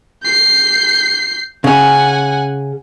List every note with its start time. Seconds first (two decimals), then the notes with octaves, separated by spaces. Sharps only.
0.24 G6 C7
1.64 C#3 C#4 F#5 G#5